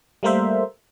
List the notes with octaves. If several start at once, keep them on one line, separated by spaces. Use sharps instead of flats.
G3 A3 A#3 A#4 C5 E5